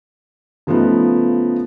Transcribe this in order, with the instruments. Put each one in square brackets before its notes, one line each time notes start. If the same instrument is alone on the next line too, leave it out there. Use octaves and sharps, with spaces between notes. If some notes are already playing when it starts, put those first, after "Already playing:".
[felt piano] C#3 F3 A3 B3 D#4